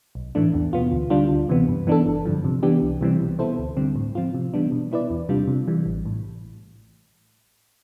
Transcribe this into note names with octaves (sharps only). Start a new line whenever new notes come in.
B1
A2 E3 A3 D4
E2
B2 B3 F4
D2
D3 G3 D4 F4
D2
C3 E3 B3
G2
E3 B3 D4 A4
G1
G2 D3 F3
C3
E3 B3 D4 G4
C2
C3 E3 G3 C4
B2
B3 E4 A4 C5
D2
D3 G3 C4
A2
F3 C4 F4
C3
E3 G3 B3 D4
B2
B3 E4 B4 D5
E2
C3 G3 D4 F4
C3
E3 G3
A1
A2